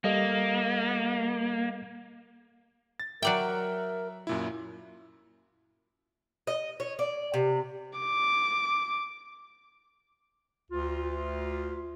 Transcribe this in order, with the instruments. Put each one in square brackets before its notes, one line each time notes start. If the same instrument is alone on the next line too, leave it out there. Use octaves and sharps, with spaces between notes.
[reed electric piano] G3 A4 D#5 [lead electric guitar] A#3
[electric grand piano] A6
[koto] F#3 D5 G5 [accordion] A#4 [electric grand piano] E5 F#6
[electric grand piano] F#2 A#2 E4
[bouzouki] D#5
C#5
D5
C3
[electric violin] D6
[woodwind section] D2 F4